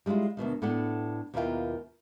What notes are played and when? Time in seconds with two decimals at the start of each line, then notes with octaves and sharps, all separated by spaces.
0.06 G3 G#3 D4 E4 F4
0.37 D2 G2 B2 D#3
0.62 A2 B3 D4 A4 F#5
1.34 D#2 B2 A#3 E4 F4 G5